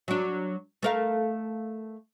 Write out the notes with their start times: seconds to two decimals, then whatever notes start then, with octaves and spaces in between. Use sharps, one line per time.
0.08 F#3 D4
0.83 A3 A#4 F5